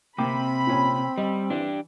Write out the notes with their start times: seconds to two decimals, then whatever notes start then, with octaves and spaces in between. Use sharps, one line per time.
0.18 C3 A#3 C4 G5 B5 D6
0.67 A#2 C#4
1.18 G3 D#5
1.50 E3 D4 G4